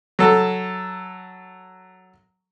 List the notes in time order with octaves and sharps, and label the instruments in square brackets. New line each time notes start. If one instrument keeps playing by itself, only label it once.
[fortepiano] F#3 A4